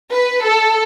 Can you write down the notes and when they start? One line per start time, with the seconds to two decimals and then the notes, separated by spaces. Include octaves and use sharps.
0.11 B4
0.44 A4